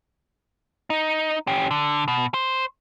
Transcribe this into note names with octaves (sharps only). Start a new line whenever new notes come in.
D#4
C#4 G4
D3
B2
C5